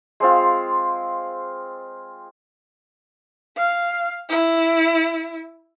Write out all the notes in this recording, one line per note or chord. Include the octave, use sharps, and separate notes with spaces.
G#3 C4 F4
F5
E4